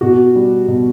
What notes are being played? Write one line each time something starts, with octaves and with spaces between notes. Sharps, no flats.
B2 F#4
G3
B2